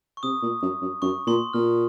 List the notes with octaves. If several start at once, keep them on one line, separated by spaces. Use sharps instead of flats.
C#6
C3 D#6
A#2
F#2
F#2
F#2 C#6
A#2 C6
A#2 F6